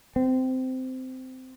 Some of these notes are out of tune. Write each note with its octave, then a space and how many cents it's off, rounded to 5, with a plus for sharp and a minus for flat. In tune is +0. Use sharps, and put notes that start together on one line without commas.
C4 -15